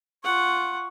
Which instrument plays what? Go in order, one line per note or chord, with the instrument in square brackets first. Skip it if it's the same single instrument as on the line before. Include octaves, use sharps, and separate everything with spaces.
[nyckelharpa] F4 F#5 [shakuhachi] C#6